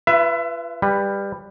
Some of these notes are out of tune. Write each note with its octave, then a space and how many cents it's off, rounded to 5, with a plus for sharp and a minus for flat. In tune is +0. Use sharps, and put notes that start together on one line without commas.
F4 -35 B4 +0 E5 +25
G3 +20 B4 +0